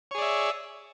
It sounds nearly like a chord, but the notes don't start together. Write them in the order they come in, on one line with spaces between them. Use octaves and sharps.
C#5 G#4 D5 E5